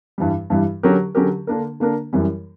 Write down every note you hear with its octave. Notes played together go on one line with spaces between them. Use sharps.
G2 E3 G3
G2 E3 G3
D3 F#3 C#4 G4 A#4
D3 F#3 C#4 G4 A#4
D3 A#3 D4 A#4
D3 A#3 D4 A#4
F#2 E3 G3